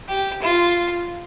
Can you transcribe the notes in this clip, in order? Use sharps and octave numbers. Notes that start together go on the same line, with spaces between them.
G4
F4